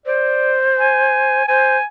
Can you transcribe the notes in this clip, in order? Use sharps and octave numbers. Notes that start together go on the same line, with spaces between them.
C5 D5
G#5
C5 G#5